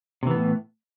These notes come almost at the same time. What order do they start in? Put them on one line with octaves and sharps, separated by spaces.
C3 E3 B3 A2